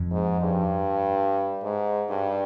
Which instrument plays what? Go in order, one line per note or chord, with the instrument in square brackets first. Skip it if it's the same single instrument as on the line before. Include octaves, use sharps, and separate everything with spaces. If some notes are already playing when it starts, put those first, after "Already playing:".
Already playing: [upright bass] F2
[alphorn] G#2
G2
G#2
G2